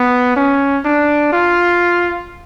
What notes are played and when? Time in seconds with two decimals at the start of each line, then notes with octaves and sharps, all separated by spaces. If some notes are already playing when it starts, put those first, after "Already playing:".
Already playing: B3
0.36 C#4
0.85 D4
1.33 F4